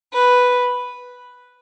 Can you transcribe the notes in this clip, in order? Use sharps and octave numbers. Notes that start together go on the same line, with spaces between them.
B4